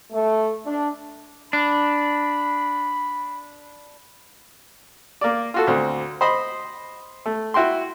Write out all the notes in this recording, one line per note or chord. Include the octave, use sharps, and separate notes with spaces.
A3
D4
D4 B5
A#3 D5
F4 F#4 A4
D2 C4
C5 D#5 B5
A3
E4 F#4 G5 C6